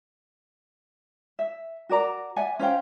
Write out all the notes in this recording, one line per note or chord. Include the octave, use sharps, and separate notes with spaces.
E5
F#4 A#4 D5 A#5
D5 E5 F#5 G#5
C#4 C5 F5 G5